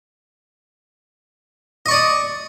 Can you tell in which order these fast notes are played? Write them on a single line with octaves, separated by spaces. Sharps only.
D#5 C#6 D5 D#6